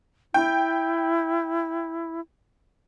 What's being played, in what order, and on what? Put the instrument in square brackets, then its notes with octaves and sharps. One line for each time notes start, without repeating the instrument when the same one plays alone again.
[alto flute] E4 [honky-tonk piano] G5